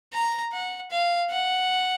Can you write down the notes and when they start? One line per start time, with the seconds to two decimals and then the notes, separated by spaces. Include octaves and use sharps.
0.13 A#5
0.52 F#5
0.91 F5
1.31 F#5